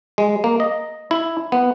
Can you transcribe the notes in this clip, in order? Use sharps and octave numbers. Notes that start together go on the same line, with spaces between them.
G#3
A#3
D#5
E4
B3